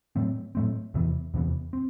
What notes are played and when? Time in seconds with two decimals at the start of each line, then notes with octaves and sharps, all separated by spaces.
0.16 A2 F#3 A3 C4
0.55 A2 F#3 A3 C4
0.94 E2 C3 E3 B3
1.34 E2 C3 E3 B3
1.73 C4